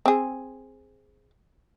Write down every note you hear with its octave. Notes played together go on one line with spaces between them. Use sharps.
C4 G#4